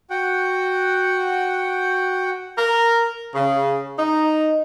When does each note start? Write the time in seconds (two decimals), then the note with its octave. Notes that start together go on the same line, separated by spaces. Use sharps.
0.10 F#4 F#5 G5
2.58 A#4
3.35 C#3
3.99 D#4